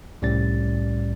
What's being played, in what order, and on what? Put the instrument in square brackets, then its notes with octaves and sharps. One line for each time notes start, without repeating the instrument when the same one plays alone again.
[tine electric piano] C2 A2 G3 C#4 D5 A6